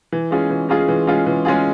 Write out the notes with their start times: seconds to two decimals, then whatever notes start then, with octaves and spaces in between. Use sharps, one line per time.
0.12 E3
0.31 G#3 C#4 F4 G#4
0.50 E3
0.69 G#3 C#4 F4 G#4
0.88 E3
1.07 G#3 C#4 F4 G#4
1.26 E3
1.45 G#3 C#4 F4 G#4